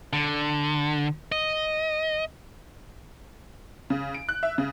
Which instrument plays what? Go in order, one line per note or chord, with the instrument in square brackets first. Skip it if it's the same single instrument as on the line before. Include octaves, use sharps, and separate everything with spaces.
[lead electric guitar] D3
D#5
[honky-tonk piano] C#3
D7
F#6
E5
C#3